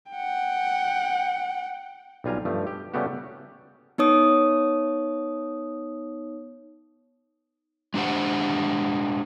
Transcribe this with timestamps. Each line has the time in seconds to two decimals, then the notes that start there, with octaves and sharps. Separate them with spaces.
0.11 F#5 G5
2.24 B1 G3 F4 G#5 A#5
2.45 G2 F3 A3
2.67 G4
2.94 C#3 G3 A3 B3 F#4 G4
3.98 B3 D#4 C#5 D#6
7.94 G#3 D4 G4 C5 F#5